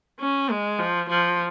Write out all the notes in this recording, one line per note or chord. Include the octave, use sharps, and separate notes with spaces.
C#4
G#3
F3
F3